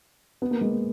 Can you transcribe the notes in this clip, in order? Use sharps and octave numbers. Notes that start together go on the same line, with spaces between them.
B3
A#3
G#3
A#3